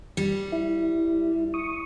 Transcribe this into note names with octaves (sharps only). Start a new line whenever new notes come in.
G3
E4
C#6 D#6